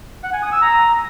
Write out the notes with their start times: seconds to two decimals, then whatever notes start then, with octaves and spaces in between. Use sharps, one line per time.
0.23 F#5
0.33 G#5
0.43 D#6
0.52 E6
0.62 A#5